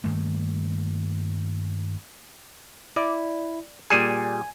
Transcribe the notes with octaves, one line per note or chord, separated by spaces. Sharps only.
G2 D#3 A3 A#3
E4 D5
A#2 G3 G#4 G#5